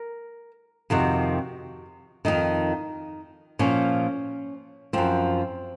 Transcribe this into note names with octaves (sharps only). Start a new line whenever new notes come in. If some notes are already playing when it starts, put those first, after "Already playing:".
Already playing: A#4
F2 C3 D#3 F#4
F2 D#3 D#4
A#2 F3 C#4
F#2 F3 C4